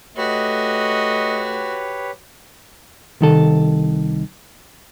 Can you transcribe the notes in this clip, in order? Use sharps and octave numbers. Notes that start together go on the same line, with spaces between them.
A3 F#4 G4 B4 C#5 D#5
C2 D#3 A4